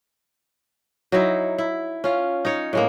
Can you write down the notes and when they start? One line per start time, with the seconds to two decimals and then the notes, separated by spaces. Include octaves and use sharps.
1.12 F#3 D#4 E4
1.58 E4
2.04 C#4 F4
2.45 D#4 C#5
2.73 A2 G#3 A#3